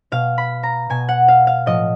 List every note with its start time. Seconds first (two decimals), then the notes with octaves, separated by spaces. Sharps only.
0.12 B2 F5
0.38 B5
0.63 A#5
0.90 B2 G#5
1.09 F#5
1.28 F5
1.47 F5
1.66 A2 F3 D#5